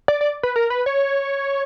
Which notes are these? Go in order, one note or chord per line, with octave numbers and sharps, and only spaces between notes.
D5
D5
B4
A#4
B4
C#5